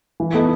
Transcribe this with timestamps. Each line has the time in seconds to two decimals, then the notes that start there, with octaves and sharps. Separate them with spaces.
0.20 E3
0.34 B3 D#4 A4